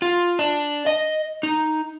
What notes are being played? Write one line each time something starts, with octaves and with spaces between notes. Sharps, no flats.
F4
D4
D#5
D#4